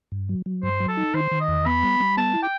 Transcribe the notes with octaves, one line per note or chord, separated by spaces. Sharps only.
G2
F#3
F#3
G2 C5
F#3
A4
D#4
D#3 C5
D#3
D#5
E2
B3 B5
G3
G3
B3 A5
E4
G5